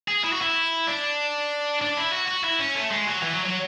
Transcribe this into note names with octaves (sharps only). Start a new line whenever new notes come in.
G#4
E4
F#4
E4
D4
D4
E4
F#4
F#4
E4
C#4
A3
G#3
F#3
E3
F#3
F#3